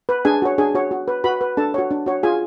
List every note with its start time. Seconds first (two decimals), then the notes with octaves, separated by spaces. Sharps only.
0.09 B4
0.25 D4 G#4 G#5
0.42 F#4 C#5
0.58 D4 G#4 G#5
0.75 F#4 C#5
0.91 F#4
1.08 B4
1.24 F#4 B4 B5
1.41 B4
1.57 D4 A4 A5
1.74 F#4 C#5
1.91 D4
2.06 F#4 C#5
2.23 F4 G#4 G#5